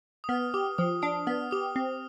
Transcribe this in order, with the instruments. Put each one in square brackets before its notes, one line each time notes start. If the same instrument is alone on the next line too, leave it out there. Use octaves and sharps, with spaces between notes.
[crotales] D#6
[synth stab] B3 [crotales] F6
[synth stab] G4 [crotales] D#6
[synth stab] F3 [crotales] D#6
[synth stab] D4 [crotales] D#6
[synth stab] B3 [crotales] F6
[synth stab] G4 [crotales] D#6
[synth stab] C4